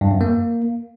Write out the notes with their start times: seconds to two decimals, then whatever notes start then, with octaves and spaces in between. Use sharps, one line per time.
0.01 G2
0.11 F#2
0.21 A#3